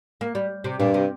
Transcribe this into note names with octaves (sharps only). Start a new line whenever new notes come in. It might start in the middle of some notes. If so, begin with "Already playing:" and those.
A#3
G3
C3
G2 A#2
C3